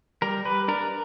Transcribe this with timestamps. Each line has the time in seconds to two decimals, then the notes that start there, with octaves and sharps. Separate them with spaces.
0.22 G3 A#4
0.45 G3 B4
0.68 D4 A#4